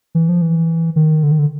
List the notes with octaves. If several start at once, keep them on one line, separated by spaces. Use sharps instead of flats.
E3
F3
E3
D#3
D3
D#3
D3